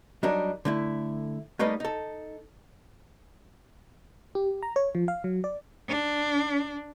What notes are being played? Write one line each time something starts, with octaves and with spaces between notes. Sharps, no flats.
F#3 G3 D4 D#4 A#4
D3 A3 E4
G3 A3 A#3 D#4 B4 D#5
D#4 A4
G4
A#5
C#5
F3
F5
F#3
D5
D4